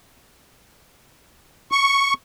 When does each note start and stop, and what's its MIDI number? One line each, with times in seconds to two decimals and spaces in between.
1.71 2.13 85